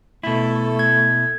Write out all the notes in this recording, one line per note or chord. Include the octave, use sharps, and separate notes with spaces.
B2 A3 E4 A4
G#6